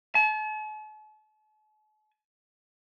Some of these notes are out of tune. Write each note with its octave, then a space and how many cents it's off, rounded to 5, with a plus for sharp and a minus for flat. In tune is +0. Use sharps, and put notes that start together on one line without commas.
A5 -45